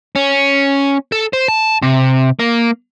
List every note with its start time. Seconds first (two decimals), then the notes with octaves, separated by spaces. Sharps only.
0.15 C#4
1.12 A4
1.33 C5
1.48 A5
1.82 C3
2.39 A#3